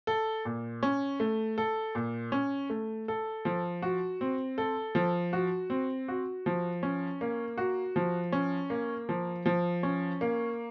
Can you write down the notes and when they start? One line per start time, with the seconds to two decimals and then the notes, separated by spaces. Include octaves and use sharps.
0.07 A4
0.45 A#2
0.83 C#4
1.20 A3
1.58 A4
1.95 A#2
2.32 C#4
2.70 A3
3.08 A4
3.45 F3
3.82 F#4
4.21 C4
4.58 A4
4.95 F3
5.33 F#4
5.70 C4
6.08 F#4
6.46 F3
6.83 C#4
7.21 A#3
7.58 F#4
7.96 F3
8.32 C#4
8.70 A#3
9.09 F3
9.46 F3
9.83 C#4
10.21 A#3